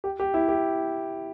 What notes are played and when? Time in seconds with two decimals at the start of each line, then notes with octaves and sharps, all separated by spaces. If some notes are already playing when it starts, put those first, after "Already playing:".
0.04 G4
0.20 G4
0.34 E4
0.48 G4